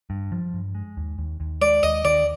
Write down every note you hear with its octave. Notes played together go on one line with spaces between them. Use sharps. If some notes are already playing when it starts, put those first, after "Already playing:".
G2
F3
G2
G#3
D#2
D#2
D#2
G#3 D5
D#2 D#5
D#3 D5